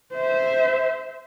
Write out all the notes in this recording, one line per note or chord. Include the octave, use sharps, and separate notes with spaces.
C5 E5